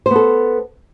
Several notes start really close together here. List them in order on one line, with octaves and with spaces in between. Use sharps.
C5 B3 A4